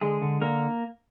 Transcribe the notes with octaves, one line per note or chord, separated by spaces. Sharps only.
D3 G#3 G#4
D3
D3 A#3 A#4